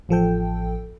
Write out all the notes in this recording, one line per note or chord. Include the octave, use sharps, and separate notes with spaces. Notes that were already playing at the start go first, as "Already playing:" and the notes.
A1 F3 A4 G5